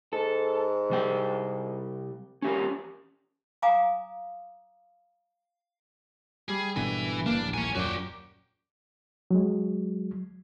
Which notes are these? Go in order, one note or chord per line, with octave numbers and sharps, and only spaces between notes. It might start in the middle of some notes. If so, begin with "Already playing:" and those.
G#2 A4
C3 G3 G5
C#4 G4 A#4
F5 G#5 A#5 D6 D#6
G3 G#4
G#1 B2 D3 E3 G#5
F#1 E3 A#3 D4
D#1 A#1 A2
A#3 C#5 G#5
D#1 F#2 A#2 C#4 F#4 D5 G5 D6
F#3 G#3